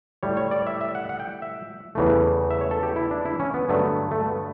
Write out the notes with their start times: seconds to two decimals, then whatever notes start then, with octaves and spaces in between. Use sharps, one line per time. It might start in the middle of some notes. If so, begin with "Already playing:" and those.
0.23 A2 G3 C#5
0.37 C#5
0.51 D5
0.67 E5
0.81 E5
0.95 F#5
1.09 F#5
1.20 G5
1.42 E5
1.95 E2 C#3 E3 A3
2.50 E5
2.61 C#5
2.71 A4
2.83 G4
2.96 E4
3.11 D4
3.25 E4
3.40 C#4
3.54 B3
3.69 G2 D3 F#3 A3 B3
4.11 A3
4.26 B3